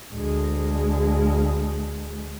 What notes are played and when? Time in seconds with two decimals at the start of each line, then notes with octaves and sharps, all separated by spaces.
0.14 D2 G#3